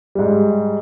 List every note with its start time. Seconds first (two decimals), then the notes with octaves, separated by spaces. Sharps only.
0.15 G#2 G3